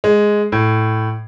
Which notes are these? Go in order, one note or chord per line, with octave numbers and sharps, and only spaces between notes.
G#3
A2